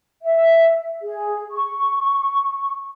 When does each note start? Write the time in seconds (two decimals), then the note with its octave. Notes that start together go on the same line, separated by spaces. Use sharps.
0.23 E5
1.02 G#4
1.52 C#6